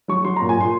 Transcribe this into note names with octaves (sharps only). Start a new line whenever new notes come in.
F#3 C#6
F#3 C6
A#5
A#2
G#5
A#2 C6